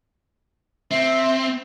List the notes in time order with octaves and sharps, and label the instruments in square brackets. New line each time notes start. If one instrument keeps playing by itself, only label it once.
[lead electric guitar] C4 [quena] E5